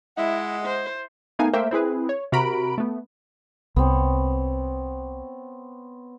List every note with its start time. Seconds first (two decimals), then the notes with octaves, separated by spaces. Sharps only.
0.17 G#3 E4 D#5 F#5
0.66 C5
1.39 A3 B3 D#4 A#4 F5 G#5
1.53 A3 A#3 A#4 C5 E5 G5
1.71 C4 E4 G#4 B4
2.09 C#5
2.32 C3 F#4 A#4 A#5 B5 D7
2.78 A3 B3
3.76 C2 B3 C4 C#5